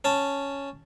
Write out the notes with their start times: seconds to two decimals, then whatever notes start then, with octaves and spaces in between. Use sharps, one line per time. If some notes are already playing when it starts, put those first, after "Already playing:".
0.04 C#4 A5